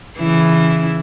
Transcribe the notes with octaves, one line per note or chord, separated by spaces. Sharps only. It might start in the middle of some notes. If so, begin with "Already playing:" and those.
C#3 E3 E4